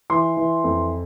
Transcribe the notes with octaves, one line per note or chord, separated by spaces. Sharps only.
E3 C6
E3
F2